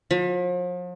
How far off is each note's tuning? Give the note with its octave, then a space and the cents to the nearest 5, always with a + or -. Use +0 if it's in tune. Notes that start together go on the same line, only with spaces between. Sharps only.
F3 +40